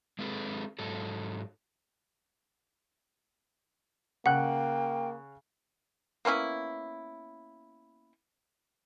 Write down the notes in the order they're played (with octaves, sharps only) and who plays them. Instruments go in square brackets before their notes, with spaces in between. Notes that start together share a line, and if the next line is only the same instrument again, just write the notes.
[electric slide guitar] G#3 C4 G#4 A4 B4
G#2 F#3 A4
[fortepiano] C#3 F#6 [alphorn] A#3 [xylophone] F#5 [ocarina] G5
[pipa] A#3 B3 C#4 E4